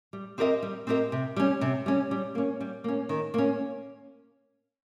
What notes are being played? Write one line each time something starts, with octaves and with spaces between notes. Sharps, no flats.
G3
C4 G4 A#4 D#5
G3
C4 G4 A#4 D#5
C3
G3 C#4
C3
G3 C#4
G3
A#3 C#4
G3
A#3 C#4
D#3
A#3 C#4